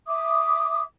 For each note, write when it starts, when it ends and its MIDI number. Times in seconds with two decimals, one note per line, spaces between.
0.08 0.82 76
0.08 0.82 86
0.08 0.82 87